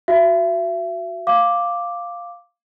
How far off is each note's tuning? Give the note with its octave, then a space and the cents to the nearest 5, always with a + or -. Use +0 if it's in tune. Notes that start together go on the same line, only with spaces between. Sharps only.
F#4 +0 E5 +35
F5 +0 D6 +0